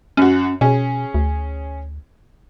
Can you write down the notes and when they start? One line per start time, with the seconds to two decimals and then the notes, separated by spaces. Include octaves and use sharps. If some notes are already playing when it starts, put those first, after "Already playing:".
0.17 F#2 C#4 F#4
0.61 B2 C#4 G#4
1.14 D2